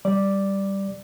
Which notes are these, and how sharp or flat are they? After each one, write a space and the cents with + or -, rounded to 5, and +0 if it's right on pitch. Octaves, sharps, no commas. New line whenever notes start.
G3 +0 D5 +0